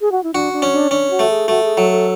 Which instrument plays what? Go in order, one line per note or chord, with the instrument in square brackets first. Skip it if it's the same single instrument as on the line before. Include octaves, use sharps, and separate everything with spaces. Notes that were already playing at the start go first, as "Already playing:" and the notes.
[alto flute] G#4
F#4
E4
[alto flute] D4 [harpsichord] F#4
[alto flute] D4
[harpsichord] C#4
[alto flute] D4
[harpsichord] C#4 [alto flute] D4
[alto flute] F#4
[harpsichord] A3
[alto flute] G#4
[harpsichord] A3 [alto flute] F#4
[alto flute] G#4
[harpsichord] F#3 [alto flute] A4
[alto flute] A4